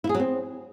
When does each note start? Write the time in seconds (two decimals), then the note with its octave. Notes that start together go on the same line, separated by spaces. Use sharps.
0.04 E4
0.09 G#4
0.14 F#3
0.20 C4